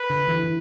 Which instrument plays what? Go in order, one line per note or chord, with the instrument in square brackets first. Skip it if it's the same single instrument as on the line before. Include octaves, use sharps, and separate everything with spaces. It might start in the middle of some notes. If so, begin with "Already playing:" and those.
Already playing: [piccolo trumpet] B4
[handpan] D3
E3
E3